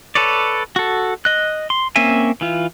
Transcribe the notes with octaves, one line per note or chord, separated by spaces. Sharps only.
A4 B4 C#5 D5
F#4 A4
D#5 F#6
C6
A#3 C4 C#4 E5 G#5
E3 F4